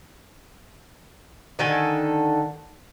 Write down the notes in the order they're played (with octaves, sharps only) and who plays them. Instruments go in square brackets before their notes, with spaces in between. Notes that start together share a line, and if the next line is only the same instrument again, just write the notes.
[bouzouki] D3 D#3 A4 G#5